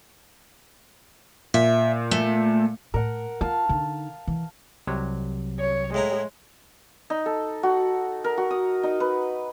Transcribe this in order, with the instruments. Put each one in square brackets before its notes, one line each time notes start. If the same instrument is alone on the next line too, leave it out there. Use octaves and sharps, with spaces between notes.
[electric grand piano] A#2 [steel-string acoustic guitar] E5
[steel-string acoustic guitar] A3
[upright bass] A2 [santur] A#4 F#5
[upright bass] F4 [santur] F5 A5
[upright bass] D3 D#4
E3
[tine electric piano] C2 C3 F#3
[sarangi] C#5
[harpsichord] A2 E4 A#5 [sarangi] G#3
[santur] D#4
A4
F#4
A#4
F#4
D#6
D#4
B4